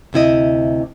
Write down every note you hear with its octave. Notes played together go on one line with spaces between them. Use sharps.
D2 C3 E4 D#5